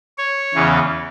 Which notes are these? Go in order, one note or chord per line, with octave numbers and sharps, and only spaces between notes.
C#5
E2 C#3 E3